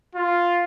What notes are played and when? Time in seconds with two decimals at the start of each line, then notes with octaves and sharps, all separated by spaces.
0.15 F4